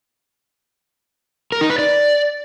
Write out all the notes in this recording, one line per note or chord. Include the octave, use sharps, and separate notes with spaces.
A#4
D#4
B4
D5